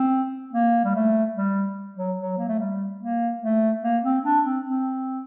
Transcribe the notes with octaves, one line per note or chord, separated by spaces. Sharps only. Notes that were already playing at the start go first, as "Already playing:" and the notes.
Already playing: C4
A#3
G3
A3
G3
F#3
F#3
A#3
A3
G3
A#3
A3
A#3
C4
D4
C4
C4